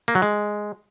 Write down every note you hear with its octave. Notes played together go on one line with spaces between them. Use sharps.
A#3
F#3
G#3